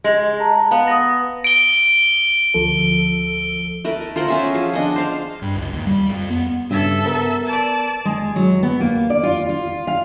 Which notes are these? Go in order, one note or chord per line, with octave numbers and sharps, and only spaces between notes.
G#3
A5 A#5
B3 F5
D#6 A#6
D7 G7
D2 F3 A4
A3 A#4 B4
F4 A#4 C5 F#5
C#4 G#4 E5
F3 G#4
D4 D#5 F#5
C5 F5
G2
C#2
D#2
G3
F2
B3
G2 C#3 A4 E5
B3 A#4
D5 A5
G#3
F#3
B3
A#3
D5
F4
F4
F5